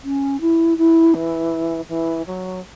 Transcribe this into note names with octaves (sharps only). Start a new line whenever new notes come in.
C#4
E4
E4
E3
E3
F#3